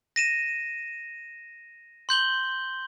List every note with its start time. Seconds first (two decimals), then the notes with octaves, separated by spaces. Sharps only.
0.16 A#6 D#7 E7
2.09 C6 G6 F#7 G7